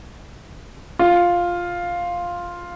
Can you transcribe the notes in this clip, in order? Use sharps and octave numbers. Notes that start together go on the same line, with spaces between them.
F4